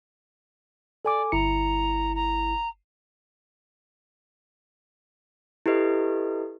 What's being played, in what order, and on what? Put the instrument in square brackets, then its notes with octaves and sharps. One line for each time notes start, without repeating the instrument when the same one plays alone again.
[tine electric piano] A4 G#5 D6 [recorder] D5
[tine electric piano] G1 E4 C#7 [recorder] A#5
[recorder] A#5
[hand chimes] E4 G4 A4 B4 D#5